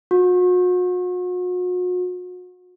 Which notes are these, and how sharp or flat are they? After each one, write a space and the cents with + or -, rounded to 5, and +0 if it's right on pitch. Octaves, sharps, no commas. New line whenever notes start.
F#4 -40